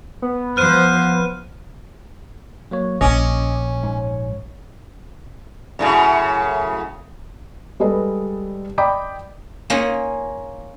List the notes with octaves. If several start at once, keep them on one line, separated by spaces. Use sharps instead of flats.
B3
F3 C5 F6 F#6 D#7
F#3 A#3 C#5
A#1 C#4 D#5 D6
G#2
F#2 A2 C#3
G3 G#3 A4 B4 D#5
D5 D#5 G5 B5 D6
A#3 C#4 D#4 F4 G#4